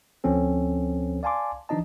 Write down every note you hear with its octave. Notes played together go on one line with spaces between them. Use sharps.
D2 F3 C4 C#4 A4
D5 F5 G#5 A5 C6 D6
E3 F3 D4 D#4 D#5 A5